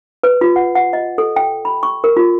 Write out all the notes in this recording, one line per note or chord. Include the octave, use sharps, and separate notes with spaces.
B4
F4
F#5
F#5
D#5
A4
G5
B5
C#6
A#4
F4